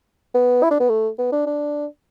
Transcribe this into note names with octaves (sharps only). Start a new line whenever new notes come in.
B3
E4
D4
B3
A3
B3
D4
D4